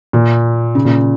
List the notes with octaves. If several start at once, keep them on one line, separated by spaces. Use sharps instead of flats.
A#2
C#3
A#2